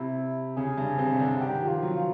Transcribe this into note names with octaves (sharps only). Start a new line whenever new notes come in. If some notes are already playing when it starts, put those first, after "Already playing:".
Already playing: C3 E4
C#3 G#4
G2
C3
C#3
D3
D#3 G4
F3
F4
F#3
F4